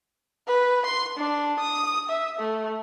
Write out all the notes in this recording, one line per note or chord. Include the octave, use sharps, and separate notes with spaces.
B4
C6
D4
D#6
E5
A3